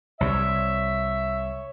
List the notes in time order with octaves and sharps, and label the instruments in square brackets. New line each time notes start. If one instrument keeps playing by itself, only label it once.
[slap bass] C2 C3 [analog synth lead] C#5 [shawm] E5